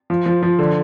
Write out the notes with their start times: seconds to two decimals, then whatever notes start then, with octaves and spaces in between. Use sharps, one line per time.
0.10 F3
0.26 F3
0.43 F3
0.59 D3